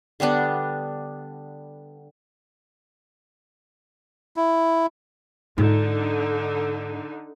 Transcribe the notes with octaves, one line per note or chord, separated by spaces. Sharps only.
D3 G3 B3 D4
E4
G#2 D3 D#4 F4